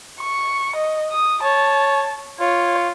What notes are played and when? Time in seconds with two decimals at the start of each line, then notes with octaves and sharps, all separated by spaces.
0.21 C#6
0.76 D#5
1.12 D#6
1.44 C#5 A5
2.40 F4 C#5